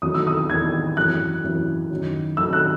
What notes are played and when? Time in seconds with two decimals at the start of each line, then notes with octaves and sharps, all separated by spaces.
0.02 E2 D#3 F#3 D#6
0.14 E6
0.27 D#6
0.50 E2 D#3 F#3 G#6
0.97 F#2 E3 F#6
1.44 F#2 E3
1.91 F#2 D#3 F#3
2.37 F#2 D#3 F#3 E6
2.53 F#6